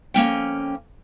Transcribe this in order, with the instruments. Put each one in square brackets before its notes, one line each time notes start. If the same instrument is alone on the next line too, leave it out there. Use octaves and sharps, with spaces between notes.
[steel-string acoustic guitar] F2 A#3 C#4 G5